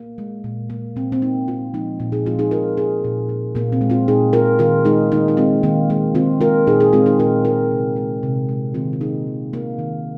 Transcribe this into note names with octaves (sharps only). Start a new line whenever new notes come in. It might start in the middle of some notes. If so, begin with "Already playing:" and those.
Already playing: A#3
G#3
A#2
A#3
A#2 C4
C4
A#3 D#4
A#2 C4 F4
F3 G#3 A#3 D#4
A#2
D#4 G#4
F3 G#3 C4 F4
D#4 G#4
A#2 F4 A#4
A#3 D#4 G#4
A#2
A#3
A#2 A#3
C4
G#3
C4 F4
A#2 D#4 G#4
G#3 F4 A#4
D#3 F4 A#4
G#3 D#4 G#4
D#3 A#3 D#4
D#4
G#3 C4 F4
D#3 A#3 D#4
G#3 A#3
D#3 C4 F4
G#3 F4 A#4
A#2 D#4 G#4
D#4 G#4
G#3 C4 F4
D#4 G#4
A#2 F4 A#4
G#3 F4 A#4
C3
G#3
C3
G#3
D#3 C4 F4
F4
A#3 D#4 G#4
D#3
A#3
D#3